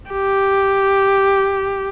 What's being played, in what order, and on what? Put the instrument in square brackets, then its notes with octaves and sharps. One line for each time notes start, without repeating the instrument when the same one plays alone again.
[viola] G4